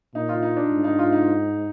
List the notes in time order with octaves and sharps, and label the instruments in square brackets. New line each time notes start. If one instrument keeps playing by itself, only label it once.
[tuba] A#2 [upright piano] D#4
[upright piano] F4
D#4
D4
[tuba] G#2
[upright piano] D#4
F4
D#4